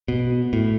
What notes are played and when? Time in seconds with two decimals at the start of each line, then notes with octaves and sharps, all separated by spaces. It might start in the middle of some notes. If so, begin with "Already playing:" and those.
0.08 B2
0.53 A2